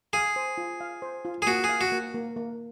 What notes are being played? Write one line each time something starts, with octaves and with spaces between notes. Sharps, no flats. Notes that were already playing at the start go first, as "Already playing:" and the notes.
G#4 F5
C5
F4
F5
C5
F4
G#4
A#3 F#4
G#4
F5
F#4
A#3
A#3
A#3